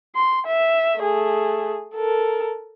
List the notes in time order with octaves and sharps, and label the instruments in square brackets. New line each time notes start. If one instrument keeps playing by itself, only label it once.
[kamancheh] C6
E5
A3 G#4
A4 A#4